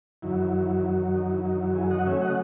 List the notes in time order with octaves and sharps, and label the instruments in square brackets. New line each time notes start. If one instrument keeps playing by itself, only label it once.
[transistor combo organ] F#2 D#3 F#3 E4
D#4
E4
D#4
E4
E4 G#4
D#5 F#5
C#3 F#3 A3 C#4 C#5 E5
D#5 F#5